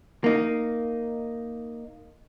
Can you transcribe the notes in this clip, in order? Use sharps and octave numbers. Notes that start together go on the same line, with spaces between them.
A#3 D#4